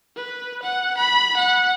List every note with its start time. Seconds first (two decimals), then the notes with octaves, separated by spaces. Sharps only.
0.16 B4
0.63 F#5
0.98 B5
1.37 F#5